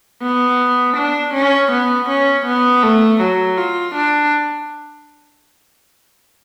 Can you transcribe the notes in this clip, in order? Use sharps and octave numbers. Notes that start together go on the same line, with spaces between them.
B3
D4
C#4
B3
C#4
B3
A3
F#3
F4
D4